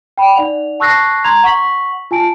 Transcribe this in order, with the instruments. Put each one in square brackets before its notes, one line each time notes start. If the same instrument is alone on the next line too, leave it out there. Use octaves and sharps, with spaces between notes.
[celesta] G5 B5
D#4 D5 F#5 F7
A5 C#6 E6 F#6 A#6 C7
A#5 C6 G#6 F7
F#5 C#6 B6 F#7
F4 G#5 A5 D7